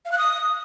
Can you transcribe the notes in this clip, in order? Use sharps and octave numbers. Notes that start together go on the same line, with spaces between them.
F5
F#6
D#6